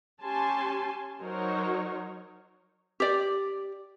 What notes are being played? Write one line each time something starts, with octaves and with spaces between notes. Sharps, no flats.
C#4 G4 G#5 A5 C6
F#3 D#4 F#4 A#4 C5 C#5
G4 D5